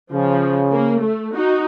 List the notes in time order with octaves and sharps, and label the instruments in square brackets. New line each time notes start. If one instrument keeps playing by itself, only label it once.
[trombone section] C#3 [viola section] F3
[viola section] A#3
A3
D#4 F#4